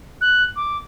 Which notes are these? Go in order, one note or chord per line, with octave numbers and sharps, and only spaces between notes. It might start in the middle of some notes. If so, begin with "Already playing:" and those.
F#6
D6